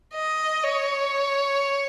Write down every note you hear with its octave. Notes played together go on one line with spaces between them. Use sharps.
D#5
C#5